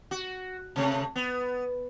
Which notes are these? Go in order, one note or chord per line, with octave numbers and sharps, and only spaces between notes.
F#4
C3 A3
B3